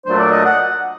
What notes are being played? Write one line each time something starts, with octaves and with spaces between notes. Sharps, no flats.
A#2 F#3 A3 D4 C5
D5
D#5
F#5